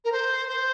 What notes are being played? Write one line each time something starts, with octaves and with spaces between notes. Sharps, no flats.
A#4
C5
C5